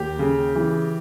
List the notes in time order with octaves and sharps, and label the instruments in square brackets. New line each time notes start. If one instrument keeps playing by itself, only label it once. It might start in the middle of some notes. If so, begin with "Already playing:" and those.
Already playing: [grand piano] D#2 G4
C#3
E3